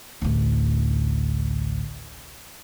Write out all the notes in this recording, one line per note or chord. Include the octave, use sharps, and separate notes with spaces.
A1 D2